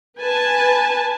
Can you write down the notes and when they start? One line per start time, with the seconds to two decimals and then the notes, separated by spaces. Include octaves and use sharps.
0.18 B4 G#5 A5